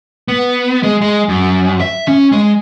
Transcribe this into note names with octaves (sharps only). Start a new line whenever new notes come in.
B3
G#3
G#3
F#2
E5
C#4
G#3